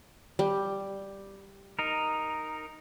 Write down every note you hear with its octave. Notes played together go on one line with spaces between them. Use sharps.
G3
D#4 A#4